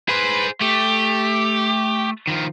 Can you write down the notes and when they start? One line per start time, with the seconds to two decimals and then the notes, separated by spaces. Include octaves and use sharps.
0.09 G#4 B4 C5
0.61 A3 G4
2.27 D#3 F3